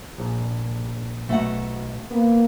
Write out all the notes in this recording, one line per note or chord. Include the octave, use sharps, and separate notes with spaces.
A#1
B1 A3 F#4 F#5
A#3 B3